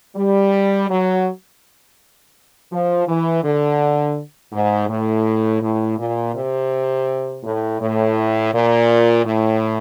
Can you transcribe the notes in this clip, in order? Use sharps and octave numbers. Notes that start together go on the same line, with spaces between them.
G3
F#3
F3
E3
D3
G#2
A2
A2
A#2
C3
A2
A2
A#2
A2